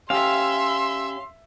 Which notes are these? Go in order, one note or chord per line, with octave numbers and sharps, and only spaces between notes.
C#4 G4 E5 F5 C6 E6